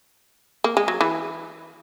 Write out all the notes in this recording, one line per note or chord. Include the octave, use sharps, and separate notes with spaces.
A#3
G#3
F#3
E3